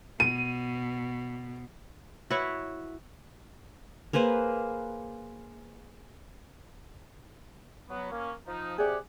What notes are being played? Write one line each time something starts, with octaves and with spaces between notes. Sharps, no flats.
B2 D#7
E4 F#4 B4 C#5
A#3 G#4 B4 C5
F#3 B3
A#3 C#4
F3 D#4
C3 G4 G#4 D5 F#5